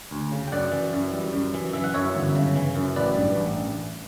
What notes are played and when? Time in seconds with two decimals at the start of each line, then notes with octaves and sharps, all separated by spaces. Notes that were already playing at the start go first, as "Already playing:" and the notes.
0.11 D2
0.31 C#3
0.48 G5
0.52 F#2 D5 F#5
0.72 E3
0.93 F#2
1.13 G3
1.33 F#2
1.54 E3
1.73 E3 E5
1.84 F#5
1.94 F#2 C#5 E5
2.15 G1
2.35 C#3
2.56 E3
2.76 F#2
2.96 A1 B4 D5
3.16 G2
3.36 A1